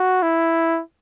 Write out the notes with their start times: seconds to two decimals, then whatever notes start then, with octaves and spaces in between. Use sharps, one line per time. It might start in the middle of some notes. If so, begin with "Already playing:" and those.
Already playing: F#4
0.22 E4